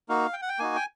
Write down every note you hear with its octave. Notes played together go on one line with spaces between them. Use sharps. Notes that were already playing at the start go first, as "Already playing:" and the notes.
A#3 D#4 F#4 F5
G5
F#5
G5
A#3 D#4 F#4 G#5
G5